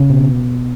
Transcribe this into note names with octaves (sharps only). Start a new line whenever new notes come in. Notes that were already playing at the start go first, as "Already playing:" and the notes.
Already playing: C#3
B2